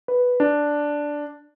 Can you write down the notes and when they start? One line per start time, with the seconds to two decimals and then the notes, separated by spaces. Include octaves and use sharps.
0.08 B4
0.40 D4